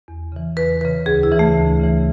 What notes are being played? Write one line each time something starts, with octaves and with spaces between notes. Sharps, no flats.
E2
C#3 E3
E2 B4
C#3 E3 B4
D2 G#4
E4
C#3 E3
A3
D2
C#3 E3